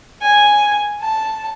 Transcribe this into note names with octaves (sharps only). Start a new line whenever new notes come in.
G#5
A5